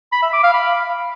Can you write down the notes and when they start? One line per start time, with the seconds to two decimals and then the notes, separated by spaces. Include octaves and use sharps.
0.12 B5
0.23 E5
0.33 D6
0.43 F5
0.54 B5